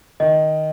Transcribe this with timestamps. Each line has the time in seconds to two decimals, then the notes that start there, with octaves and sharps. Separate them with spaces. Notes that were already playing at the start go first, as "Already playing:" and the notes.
0.20 D#3 D#5